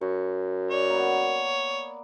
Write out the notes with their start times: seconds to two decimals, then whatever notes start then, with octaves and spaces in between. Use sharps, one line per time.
0.01 F#2 C#6
0.71 C#5 D5
0.90 A#3 B3